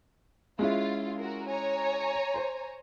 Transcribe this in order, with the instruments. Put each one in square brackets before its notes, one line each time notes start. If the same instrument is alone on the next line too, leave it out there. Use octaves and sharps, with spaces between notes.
[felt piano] G#3 C#4 E4 [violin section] F4
[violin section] F#4 A#4
C#5 G#5 A#5
[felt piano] C5 C6